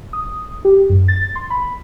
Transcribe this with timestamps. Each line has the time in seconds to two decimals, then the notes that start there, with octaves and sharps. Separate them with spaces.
0.13 D#6
0.65 G4
0.89 F#2
1.08 A6
1.36 C6
1.50 B5